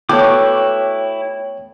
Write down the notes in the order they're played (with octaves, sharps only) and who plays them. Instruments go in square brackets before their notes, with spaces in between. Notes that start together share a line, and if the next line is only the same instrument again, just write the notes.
[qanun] A3 B3 F#4 [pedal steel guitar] E4 D6 [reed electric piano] C#5 G5